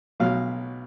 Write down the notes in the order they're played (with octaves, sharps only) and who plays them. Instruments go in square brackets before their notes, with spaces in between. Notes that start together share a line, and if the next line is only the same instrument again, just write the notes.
[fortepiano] B1 B2 F#3 F5